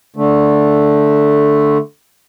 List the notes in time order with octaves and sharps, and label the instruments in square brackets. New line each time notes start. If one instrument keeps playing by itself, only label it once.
[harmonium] D3 A3